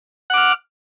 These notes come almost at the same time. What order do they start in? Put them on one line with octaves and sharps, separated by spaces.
F#5 D6 F6